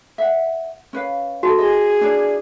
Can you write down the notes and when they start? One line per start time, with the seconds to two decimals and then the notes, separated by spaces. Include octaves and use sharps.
0.18 E5 F#5
0.93 C#4 B4 F5
1.43 F#4 A4 A5
1.58 G#4 D#5
2.01 D4 E4 D5